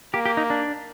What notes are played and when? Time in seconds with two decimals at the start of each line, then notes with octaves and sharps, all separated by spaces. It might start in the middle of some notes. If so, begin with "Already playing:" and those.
0.14 A#3 G4
0.26 G4
0.37 D#4
0.50 D4